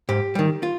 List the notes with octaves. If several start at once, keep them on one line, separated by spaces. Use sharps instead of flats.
G#2 G4
D#3 G3
F4